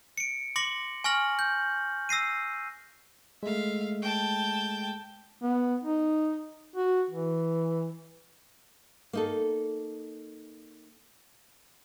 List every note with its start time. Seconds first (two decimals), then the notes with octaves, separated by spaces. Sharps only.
0.18 C#7 D7
0.56 C6 D6 A#6 C#7 F#7
1.04 G#5 C#6 F6 A#6 F#7
1.39 G6
2.09 E6 A#6 C7 D#7
3.43 G#3 A3 E5 F5
4.02 G5 A5
5.42 B3
5.84 D#4
6.76 F#4
7.10 E3
9.13 A#3 D#4 A4